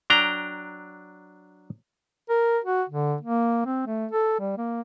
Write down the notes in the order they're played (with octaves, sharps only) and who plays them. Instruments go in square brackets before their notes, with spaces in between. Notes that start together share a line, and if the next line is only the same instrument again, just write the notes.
[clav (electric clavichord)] F#3 D4 G5 A#5
[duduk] A#4
F#4
D3
A#3
C4
A3
A4
G3
A#3